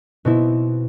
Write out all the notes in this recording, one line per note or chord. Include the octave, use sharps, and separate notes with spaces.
B2 C4 E4